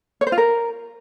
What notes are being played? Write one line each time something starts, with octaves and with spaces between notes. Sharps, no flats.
C#5
C5
F4
A#4